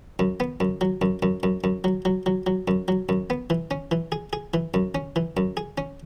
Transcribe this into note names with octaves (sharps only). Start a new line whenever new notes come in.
F#2
B3
F#2
F#3
F#2
F#2
F#2
F#2
F#3
F#3
F#3
F#3
F#2
F#3
F#2
B3
E3
C#4
E3
G#4
G#4
E3
F#2
C#4
E3
F#2
G#4
C#4